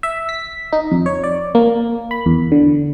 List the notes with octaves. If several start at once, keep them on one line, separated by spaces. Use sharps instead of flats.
E5
B6
D#4
F2
C#5
D5
A#3
B5
E2
D3